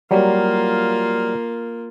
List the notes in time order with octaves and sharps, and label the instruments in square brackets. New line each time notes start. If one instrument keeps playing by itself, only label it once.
[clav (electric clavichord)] F#3 G3 [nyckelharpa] A#3 F4